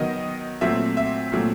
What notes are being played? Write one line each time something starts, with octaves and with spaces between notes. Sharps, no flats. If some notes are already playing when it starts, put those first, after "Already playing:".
Already playing: D#3 F#3 B3 D#5
A#2 F#3 A3 C4 E5
E5
A#2 F#3 A3 C4